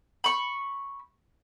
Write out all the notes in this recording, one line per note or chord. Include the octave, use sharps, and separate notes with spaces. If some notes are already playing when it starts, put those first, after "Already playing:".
B5 C#6